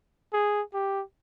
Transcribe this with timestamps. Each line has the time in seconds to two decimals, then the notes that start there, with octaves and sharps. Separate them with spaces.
0.33 G#4
0.74 G4